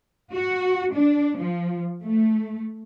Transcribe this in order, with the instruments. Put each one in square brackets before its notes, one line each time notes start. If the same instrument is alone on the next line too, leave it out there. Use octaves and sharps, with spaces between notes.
[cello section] F#4
D4
F3
A3